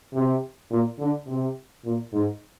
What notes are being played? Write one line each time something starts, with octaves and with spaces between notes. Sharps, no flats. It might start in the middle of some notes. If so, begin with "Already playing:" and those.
C3
A#2
D3
C3
A#2
G#2